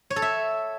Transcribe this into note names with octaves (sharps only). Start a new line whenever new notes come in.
C#5
A4
E5